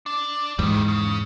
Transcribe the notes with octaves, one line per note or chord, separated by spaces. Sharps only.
D4
E2 G#2 D#3 G3
C#3